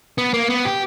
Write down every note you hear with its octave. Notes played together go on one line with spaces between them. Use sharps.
B3
A#3
B3
G4